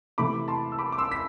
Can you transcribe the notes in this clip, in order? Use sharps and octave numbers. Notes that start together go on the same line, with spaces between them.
C3 E3 A3 E4 B5 D6
A5 C6
E6
B5 D6
D6
C6 E6
B6